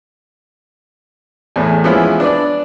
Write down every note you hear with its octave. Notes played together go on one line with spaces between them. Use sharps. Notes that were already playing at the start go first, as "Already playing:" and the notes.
E2 A2 G#4
E3 F3 G#3 B3 C#4 E4
D4 B4 D5